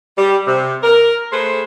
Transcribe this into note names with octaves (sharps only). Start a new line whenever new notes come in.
G3
C3
A#4
A3 G#4 B4 C5